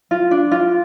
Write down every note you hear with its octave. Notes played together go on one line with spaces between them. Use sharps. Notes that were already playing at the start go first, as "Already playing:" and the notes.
F4
D4
F4